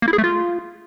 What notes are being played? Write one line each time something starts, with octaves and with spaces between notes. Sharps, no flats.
A#3
E4
G#4
A3
F4